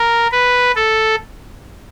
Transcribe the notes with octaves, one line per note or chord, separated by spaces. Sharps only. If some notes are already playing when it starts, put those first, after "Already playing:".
Already playing: A#4
B4
A4